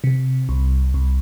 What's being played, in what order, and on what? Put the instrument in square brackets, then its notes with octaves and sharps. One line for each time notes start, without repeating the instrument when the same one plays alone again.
[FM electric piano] C3
C2
C2